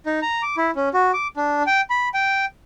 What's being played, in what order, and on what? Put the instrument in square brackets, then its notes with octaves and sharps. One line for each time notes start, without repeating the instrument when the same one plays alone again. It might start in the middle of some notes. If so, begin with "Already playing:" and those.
[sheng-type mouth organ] D#4
A#5
D6
E4
C#4
F#4
D6
D4
G5
B5
G5